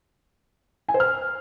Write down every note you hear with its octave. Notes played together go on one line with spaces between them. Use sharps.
G#5
C5
F6